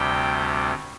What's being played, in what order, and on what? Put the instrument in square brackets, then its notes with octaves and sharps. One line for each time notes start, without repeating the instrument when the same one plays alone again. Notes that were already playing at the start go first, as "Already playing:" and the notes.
Already playing: [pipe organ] D2 C3 G3 G5